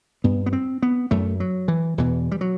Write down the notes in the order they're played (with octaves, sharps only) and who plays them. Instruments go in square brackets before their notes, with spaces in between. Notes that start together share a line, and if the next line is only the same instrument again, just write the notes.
[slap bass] G2 B3
B3
C4
B3
F#2 A3
F#3
E3
E2 B2 E3
G3
F#3